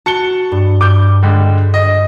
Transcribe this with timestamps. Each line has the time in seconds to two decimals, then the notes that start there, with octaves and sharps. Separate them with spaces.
0.06 F#4 A5 C#7 G7
0.52 G2
0.81 G2 G4 D6 G6
1.23 D3 G3 G#3
1.74 D#5